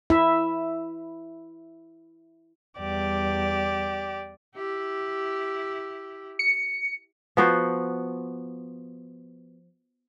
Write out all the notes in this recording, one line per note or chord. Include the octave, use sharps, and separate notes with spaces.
E4 E5
E2 G3 G4 D5
E4 G4
C#7
F3 B3 F#4 C5